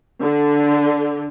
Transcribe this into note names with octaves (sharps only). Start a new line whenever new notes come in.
D3